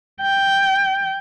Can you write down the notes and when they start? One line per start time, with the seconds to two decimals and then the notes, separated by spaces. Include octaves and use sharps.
0.21 G5